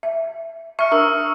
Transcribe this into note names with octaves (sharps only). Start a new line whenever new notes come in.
E5
E5 C#6 F6 C#7
D4 A#4 D#6 E6